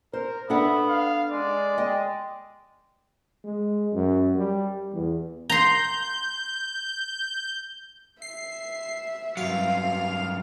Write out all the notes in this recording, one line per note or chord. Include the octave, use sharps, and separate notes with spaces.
A#4 C5
B3 D4 A4 E5 F#5
F5
G#3 D5
D#5 G5
G#3
F#2
G3
E2
A#5 C6 G6
E5 C7
G2 F#3 F5